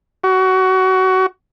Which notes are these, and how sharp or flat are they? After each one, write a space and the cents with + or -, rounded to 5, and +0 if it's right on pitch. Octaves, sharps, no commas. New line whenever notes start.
F#4 +20